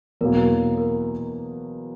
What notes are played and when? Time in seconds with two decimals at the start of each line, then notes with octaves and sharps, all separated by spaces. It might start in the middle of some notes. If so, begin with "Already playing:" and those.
0.21 E2 B2 F#3 A#3 A#4
0.78 A#4